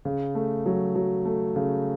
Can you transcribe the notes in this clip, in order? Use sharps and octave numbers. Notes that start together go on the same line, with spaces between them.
C#3
A3
F#3
F#3
A3
C#3